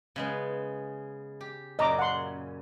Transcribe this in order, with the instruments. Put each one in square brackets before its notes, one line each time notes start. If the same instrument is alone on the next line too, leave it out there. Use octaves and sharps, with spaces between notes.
[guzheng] C#3 G#3 B3
G4
[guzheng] F#2 A#2 C#3 [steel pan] D#5 A#5 D6
[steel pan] F#5 C6